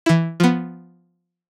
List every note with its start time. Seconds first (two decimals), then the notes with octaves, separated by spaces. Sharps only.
0.06 E3 E4
0.40 F3 B3